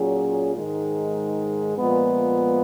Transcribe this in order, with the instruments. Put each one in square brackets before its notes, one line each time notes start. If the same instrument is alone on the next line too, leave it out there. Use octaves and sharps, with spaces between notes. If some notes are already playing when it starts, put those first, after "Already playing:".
Already playing: [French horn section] A#2 F#3 C#4 F4 G#4
G#2 D#3 G#3
A#2 F3 G#3 B3